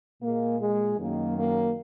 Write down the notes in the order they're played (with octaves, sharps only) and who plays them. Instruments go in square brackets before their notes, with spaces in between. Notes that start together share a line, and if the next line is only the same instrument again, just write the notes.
[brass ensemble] A#2 G#3 A#3
G#3
F#2 D#3 F#3 A#3
A#3